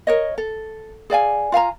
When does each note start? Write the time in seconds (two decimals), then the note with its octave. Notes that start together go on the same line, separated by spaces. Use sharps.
0.07 A#4 C#5 D#5
0.38 A4
1.10 G#4 D5 F5 G#5
1.52 F4 F5 G#5 A#5